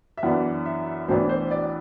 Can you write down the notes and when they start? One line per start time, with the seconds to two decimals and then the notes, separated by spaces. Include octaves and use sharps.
0.18 E5
0.23 F#2 E3 B3 D4 F#5
0.66 E5
1.08 B1 A2 E3 B3 D4 C5
1.29 C5
1.51 D5